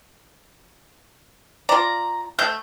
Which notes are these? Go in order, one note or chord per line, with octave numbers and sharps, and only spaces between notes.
F4 D5 A#5
A3 G6